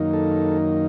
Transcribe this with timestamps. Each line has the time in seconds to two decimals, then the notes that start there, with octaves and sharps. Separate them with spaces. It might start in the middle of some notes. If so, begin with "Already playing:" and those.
Already playing: F#2 D#3 A#3 D#4
0.13 A4